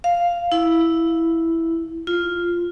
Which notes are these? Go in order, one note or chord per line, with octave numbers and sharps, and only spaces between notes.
F5
E4
F4